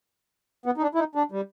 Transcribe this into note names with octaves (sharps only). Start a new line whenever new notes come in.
B3
D#4
D4
E4
D#4
D4
G3